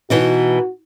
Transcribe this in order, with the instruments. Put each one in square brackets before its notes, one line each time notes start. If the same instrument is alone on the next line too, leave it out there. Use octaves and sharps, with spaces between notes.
[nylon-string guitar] B2 E3 D#4 [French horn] F#4